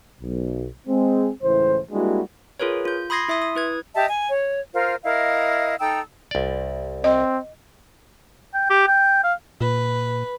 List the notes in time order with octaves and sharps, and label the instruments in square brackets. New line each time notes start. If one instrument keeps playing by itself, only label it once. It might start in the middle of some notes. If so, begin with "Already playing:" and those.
[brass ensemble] B1
G#3 C4
C#2 A2 E3 C5
G3 G#3 A#3 D4 E4 F#4
[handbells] F4 G#4 A#4 B4 C#5
F4 G6
B5 C6 D#6 G#6 A#6 C7
E4 E5 C6 D#6
D#6
E4 B4 G#6
[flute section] G4 D#5 E5 A5
G#5
C#5
F4 A#4 C5
E4 A#4 D#5 F5
D#4 A4 G5 E6
[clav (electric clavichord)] C2 D5
[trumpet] C4 [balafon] D#5
[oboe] G5
G4
G5
F5
[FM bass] A#2 [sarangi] B4